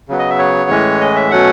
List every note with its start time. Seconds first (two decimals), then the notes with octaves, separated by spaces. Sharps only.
0.09 C#3 F#3 B3
0.19 D#5
0.30 E5
0.39 C#5
0.70 A2 E3 G#3 C#4
1.01 D#5
1.16 E5
1.31 B2 F#3 A3 C#4 F#5